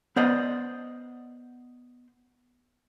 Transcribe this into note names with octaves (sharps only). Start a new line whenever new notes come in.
B3 C5 D5 D#5